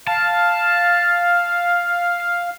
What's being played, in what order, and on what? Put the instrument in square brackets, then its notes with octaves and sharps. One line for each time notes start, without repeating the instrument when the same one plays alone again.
[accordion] F5 [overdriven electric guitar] A5